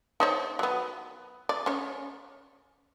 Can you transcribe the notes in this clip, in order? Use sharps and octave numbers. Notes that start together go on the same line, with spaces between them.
D#4 C5 C#5
F#3 B3
D5
C#4 C#5